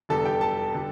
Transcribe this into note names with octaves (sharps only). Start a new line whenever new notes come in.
F1 E2 D3 G3 A4 A5
G4 G5
A4 A5
D3 G3